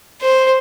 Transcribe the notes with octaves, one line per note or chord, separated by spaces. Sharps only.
C5